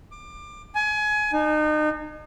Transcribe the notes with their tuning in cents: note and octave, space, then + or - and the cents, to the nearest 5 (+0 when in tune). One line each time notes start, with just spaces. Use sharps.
D6 +25
G#5 +25
D#4 -35